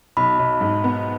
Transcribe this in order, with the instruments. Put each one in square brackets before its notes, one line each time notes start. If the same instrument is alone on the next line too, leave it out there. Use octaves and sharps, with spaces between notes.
[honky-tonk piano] B1 [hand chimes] B5
[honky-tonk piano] B1
G#2
B3